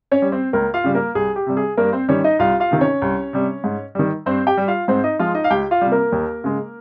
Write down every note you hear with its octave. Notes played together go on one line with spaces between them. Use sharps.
C#4 C#5
G3
C4 C5
C#2 A#3 A#4
F4 F5
C#3 G3
A#3 A#4
C2 G#4
G4
C3 G3
G#4
G2 A#3 A#4
C4 C5
D#3 G3 C#4 C#5
D#4 D#5
C2 F4 F5
F4 F5
C3 D#3
C#4 C#5
C2
C3 G3
G#2
D#3 G3
G2 C4 C5
G4 G5
G3
F4 F5
G#2 C4 C5
D#4 D#5
F3 G#3 F4 F5
D#4 D#5
F5
C#2 G4 G5
F4 F5
C3 G3
A#3 A#4
D#2
C#3 G#3